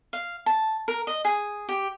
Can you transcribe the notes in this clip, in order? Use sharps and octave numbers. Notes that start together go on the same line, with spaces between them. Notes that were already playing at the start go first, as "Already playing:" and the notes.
F5
A5
A#4
D#5
G#4
G4